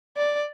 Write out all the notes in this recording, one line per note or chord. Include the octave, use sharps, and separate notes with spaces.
D5